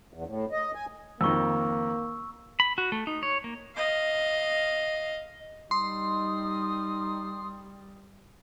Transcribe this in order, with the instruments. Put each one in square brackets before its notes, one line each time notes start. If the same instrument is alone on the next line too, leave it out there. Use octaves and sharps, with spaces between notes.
[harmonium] E2
A2
D#5
G#5
[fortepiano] F2 D#3 [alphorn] A#3 [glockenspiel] C#6 E6
[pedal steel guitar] B5
F#4
A3
D#4
C#5
A#3
[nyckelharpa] D#5 F5
[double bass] G3 [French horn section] D#4 [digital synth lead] C6 [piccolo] D#6